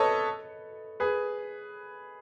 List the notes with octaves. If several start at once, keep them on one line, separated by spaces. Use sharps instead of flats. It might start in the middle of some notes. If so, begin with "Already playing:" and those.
Already playing: A4 B4 C#5 D#5
G#4 B4